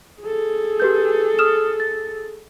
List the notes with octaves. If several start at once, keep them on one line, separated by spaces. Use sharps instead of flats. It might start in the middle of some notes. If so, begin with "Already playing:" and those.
G#4 A4
G4 B4 G6
D#6 F6 E7
A6